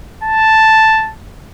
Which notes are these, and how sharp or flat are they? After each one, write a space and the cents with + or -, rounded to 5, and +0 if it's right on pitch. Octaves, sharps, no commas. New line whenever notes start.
A5 +0